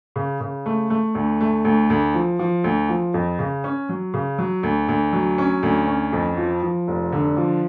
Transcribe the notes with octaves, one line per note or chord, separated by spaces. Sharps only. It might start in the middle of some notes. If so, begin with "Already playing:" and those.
C#3
C#3
A3
A3
D2
A3
D2
D2
F3
F3
D2
F3
F2
C#3
C#4
F#3
C#3
F#3
D2
D2
F#3
C#4
D2
C#4
F2
F3
F3
F1
D3
F3